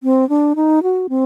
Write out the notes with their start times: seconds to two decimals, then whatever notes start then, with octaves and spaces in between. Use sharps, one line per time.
0.03 C4
0.29 D4
0.56 D#4
0.83 F#4
1.09 C4